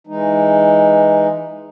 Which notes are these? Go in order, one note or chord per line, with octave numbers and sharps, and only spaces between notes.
E3 G#3 D#4